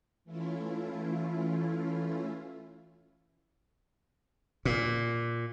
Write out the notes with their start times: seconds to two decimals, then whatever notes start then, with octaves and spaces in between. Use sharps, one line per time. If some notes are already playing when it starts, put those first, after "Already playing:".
0.25 E3 A3 C#4 E4 F4
4.65 A#2